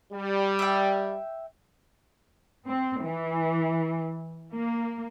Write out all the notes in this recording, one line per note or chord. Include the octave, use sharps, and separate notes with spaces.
G3
E5 G5
C4
E3
A#3